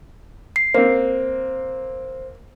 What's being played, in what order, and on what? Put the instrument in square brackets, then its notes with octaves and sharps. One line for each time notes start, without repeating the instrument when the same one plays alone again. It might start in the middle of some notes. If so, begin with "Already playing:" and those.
[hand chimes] C7
[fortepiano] A#3 C4 [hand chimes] C5